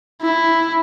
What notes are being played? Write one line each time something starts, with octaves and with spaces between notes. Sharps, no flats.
E4